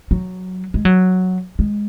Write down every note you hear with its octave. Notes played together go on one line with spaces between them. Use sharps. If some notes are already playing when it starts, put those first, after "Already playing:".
F#3
G#3
F#3
G#3